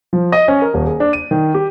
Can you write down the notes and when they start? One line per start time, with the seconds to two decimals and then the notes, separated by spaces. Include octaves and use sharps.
0.13 F3
0.32 D#5
0.48 C#4
0.62 A#4
0.74 D#1
0.86 G#4
1.00 D4
1.13 D#7
1.31 D#3
1.54 G4